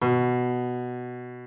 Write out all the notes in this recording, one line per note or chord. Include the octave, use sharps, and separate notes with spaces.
B2